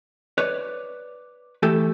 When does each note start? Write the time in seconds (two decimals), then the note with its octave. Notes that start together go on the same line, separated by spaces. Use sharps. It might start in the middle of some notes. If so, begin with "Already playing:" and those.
0.38 B4 C#5 D5
1.63 E3 A3 G4 A4